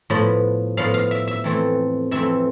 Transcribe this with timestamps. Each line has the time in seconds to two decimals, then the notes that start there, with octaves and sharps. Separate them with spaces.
0.10 A2 F3 B3
0.77 A2 F3 B3 F5
0.94 F5
1.11 E5
1.27 E5
1.44 F2 E3 A3 C4
2.11 F2 E3 A3 C4 E5